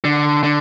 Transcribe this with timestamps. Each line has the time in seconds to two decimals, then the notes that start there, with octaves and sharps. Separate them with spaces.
0.04 D3
0.43 D3